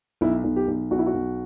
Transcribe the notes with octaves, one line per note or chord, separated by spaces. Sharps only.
B1 E4
B1
G4
B1
B1 F#4
E4
F#4
B1